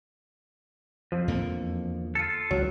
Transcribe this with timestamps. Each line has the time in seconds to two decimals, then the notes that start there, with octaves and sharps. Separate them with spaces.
1.12 F2 F3
1.28 E2 D3 A#3
2.15 F4 A4
2.51 C#2 F#3